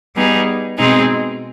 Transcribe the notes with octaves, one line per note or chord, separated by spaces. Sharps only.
G3 B3 D#4 G#4
B2 G#3 C4 D#4 G#4